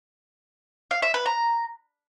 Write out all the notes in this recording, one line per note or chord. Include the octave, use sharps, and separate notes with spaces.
F5
E5
B4
A#5